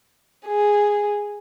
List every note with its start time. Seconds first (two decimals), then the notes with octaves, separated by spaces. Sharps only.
0.47 G#4